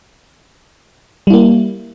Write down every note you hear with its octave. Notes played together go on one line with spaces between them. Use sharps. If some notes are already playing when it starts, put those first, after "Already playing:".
G3 A#3 E4